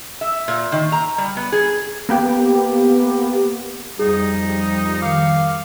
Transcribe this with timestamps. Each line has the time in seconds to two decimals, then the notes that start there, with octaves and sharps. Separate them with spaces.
0.21 E5
0.48 A#2
0.72 D#3
0.92 A#5
1.18 G3
1.37 B3
1.52 G#4
2.09 A#3 B3 G4
3.99 F2 F3 G3 D#4 G#4
5.02 D#3 F5 D6 C#7